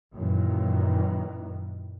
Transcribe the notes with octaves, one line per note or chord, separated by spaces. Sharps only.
F#2 A#2 D#3 E3